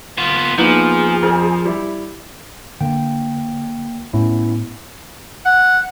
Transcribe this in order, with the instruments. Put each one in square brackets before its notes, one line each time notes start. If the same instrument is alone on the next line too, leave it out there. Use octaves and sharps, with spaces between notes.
[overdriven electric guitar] B3 F4
[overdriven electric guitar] F3 [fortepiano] A#3 B3 D#4 [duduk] G#4
[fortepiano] F2 C4 A#4
G3 E4
[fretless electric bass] D3 [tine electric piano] A#3 G5
[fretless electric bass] A2 [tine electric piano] B3 C#4 E4
[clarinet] F#5